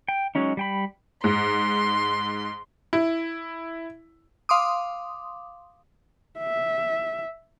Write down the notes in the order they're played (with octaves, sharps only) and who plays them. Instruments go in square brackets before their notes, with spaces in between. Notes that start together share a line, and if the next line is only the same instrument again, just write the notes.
[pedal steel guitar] G5
F#3 G#3 C#4 D#4
G3 G5 B5
[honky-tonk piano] G#2 [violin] C6
[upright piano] E4
[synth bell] F5 C6 D6 D#6
[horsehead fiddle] E5